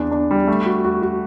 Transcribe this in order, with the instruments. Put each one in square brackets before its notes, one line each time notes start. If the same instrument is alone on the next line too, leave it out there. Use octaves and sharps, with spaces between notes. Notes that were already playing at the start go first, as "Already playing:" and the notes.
Already playing: [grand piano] E2 D4
D4
G3
A3
F#4
F#4
F#4